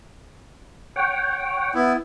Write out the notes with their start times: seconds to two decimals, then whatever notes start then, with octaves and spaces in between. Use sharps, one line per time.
0.96 C#5 F#5 G5
1.75 B3 E4